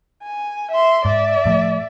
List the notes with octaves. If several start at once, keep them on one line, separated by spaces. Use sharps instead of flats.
G#5
E5 C6
G#2 D5 E5
A2 F3 A3